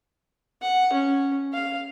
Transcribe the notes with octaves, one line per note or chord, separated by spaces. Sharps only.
F#5
C#4
F5